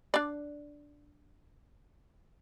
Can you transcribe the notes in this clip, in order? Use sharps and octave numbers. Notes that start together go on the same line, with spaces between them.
D4 D5